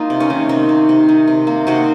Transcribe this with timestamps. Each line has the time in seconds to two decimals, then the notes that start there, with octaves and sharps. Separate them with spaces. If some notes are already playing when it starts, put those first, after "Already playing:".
Already playing: A#3 D#4 F4
0.10 C3
0.20 C#4
0.30 D#3
0.49 C3 D#4
0.69 A#3
0.89 C3
1.09 D#3
1.28 C3
1.47 A#3
1.67 C3 D#4 F#4